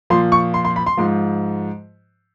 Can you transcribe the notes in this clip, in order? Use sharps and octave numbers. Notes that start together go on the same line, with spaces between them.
A#2 F3 C6
C#6
C6
C6
B5
C6
G#2 F3